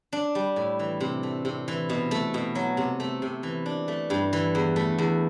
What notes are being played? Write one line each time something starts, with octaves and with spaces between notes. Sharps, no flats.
D4
G3
A2
E3
C3
A3
C3
E3
B2
A3
B2
F#3
C3
A3
C3
E3
D4
A3
G2
E3
E2
A3
E2